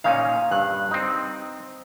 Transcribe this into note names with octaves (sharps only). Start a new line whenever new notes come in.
A#2 C#4 D#4 F5
G2 F#6
C4 D#4